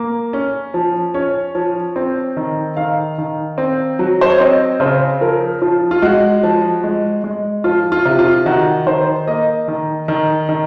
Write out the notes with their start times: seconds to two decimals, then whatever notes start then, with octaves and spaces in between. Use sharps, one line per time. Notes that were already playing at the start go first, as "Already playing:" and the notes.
Already playing: A#3
0.33 C#4
0.74 F3
1.14 C#4 C#5
1.55 F3
1.96 C4
2.37 D#3
2.77 D#3 F5
3.18 D#3
3.58 C4
3.99 F#3
4.21 C5
4.30 C#5
4.40 C4 D#5
4.80 C#3 C5
5.21 F3 A#4
5.62 F3 F4
5.91 F4
6.02 G#3 F#4
6.43 F3
6.84 G#3
7.24 G#3
7.64 F3 F4
7.92 F4
8.05 C3
8.19 F4
8.46 D#3 F#4
8.86 D#3 C5
9.27 A#3 D#5
9.68 D#3
10.08 D#3
10.49 D#3